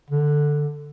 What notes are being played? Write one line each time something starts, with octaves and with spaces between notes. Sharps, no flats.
D3